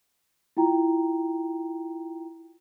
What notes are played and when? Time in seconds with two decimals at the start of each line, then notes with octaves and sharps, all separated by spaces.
0.57 E4 F4 G5 A#5